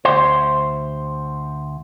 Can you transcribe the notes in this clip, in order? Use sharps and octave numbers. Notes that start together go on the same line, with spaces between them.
D2 C5